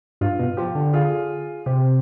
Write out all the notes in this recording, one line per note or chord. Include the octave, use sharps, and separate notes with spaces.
G2 F4
B2
F3 G4
D3
F4 G#4
C3 G4